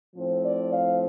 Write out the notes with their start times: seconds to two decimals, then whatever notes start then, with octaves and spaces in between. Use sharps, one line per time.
0.15 A2 F3 C4
0.43 D5
0.72 F5